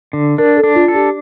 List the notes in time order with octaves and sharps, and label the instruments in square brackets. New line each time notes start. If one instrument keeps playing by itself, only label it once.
[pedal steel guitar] D3
[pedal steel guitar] D4 [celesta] A#4
[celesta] A4
[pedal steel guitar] D4
[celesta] F4
[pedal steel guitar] A4
[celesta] G4